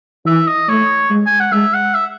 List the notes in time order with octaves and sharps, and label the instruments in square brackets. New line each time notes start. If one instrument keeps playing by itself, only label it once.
[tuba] E3 [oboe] E5
[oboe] D#5
[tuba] A3 [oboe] C#5
[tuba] G#3
[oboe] G#5
F#5
[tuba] G#3 [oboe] E5
[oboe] F#5
E5